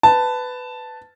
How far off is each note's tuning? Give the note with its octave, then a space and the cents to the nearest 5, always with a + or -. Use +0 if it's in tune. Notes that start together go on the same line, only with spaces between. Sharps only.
B4 +15 A5 +0